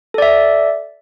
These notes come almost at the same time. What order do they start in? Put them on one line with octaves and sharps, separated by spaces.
A4 D5 E5